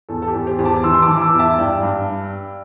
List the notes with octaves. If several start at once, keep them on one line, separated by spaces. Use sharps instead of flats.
E2 A4
A4
G4
E2
G4 C5
E2
A5 D6
E3 C6 E6
C6
A5 D6
E3
E6
A5 D6
E2
E5 A5
G2 D5 G5
G2